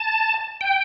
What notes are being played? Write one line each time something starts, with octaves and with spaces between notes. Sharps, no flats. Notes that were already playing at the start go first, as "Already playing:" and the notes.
Already playing: A5
G5